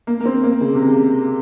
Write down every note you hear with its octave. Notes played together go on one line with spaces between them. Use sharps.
A#3
A#3
C4
A#3
C#3
C3
C#3